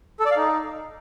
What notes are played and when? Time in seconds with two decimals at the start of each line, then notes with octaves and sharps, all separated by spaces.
0.20 A4
0.25 D5
0.31 F5
0.37 D#4